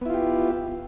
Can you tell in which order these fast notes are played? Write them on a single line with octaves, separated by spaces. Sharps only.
B3 E4 F4 G4